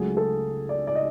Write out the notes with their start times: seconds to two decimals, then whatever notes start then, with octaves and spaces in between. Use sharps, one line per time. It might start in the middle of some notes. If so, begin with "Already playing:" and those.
Already playing: C#2 C#3 F#3 A3 G#4
0.17 A4
0.69 D5
0.87 D5
0.95 D#5